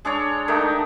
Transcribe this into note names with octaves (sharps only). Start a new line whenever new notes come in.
G#3 D4 A4 C#5
D#3 A3 D4 D#4